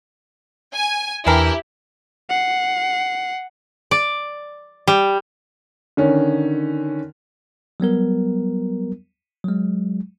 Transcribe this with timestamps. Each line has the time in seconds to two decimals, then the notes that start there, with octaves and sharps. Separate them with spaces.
0.74 G#5
1.27 E2 E3 D4 E4 G4 A#4
2.30 F#5 C7
3.91 D5
4.88 G3
5.97 D3 D#3 C#4
7.80 F#3 G3 B3 A#4
9.44 F#3 G#3